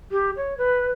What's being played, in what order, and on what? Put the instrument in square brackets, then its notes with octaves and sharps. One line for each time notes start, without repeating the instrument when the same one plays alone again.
[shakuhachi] G4
C#5
B4